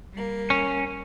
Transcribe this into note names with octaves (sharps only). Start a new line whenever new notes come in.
G3 A#3
C#4